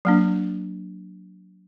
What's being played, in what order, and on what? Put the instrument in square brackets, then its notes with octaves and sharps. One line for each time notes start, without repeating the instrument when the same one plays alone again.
[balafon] F#3 A#3 D4